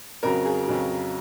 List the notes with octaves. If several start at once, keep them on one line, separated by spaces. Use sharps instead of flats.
F2 C#3 F#3 A#4
G#4
F2 C#3 F#3